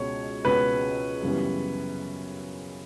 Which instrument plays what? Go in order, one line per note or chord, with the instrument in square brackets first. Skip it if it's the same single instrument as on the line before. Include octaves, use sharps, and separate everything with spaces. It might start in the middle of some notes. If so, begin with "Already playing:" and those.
Already playing: [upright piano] C#2 B2 G#3 C#4 F#4 [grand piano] C#5
[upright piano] C#2 B2 G#3 C#4 F#4 [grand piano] B4
[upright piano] F#2 C#3 E3 G3 B3